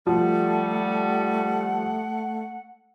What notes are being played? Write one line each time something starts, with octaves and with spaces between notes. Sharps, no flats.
F3 G3 A3 F#5